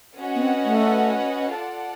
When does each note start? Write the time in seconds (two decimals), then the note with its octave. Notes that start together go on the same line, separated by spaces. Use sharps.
0.19 C#4 F#4 B4 D#5 F#5
0.35 B3
0.42 C4
0.64 A3
1.57 F4 A4 D5 F#5 A5